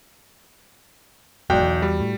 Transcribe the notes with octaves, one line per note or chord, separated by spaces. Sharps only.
E1 B1 G#2 F#4 D5 G5
E2
G3
A2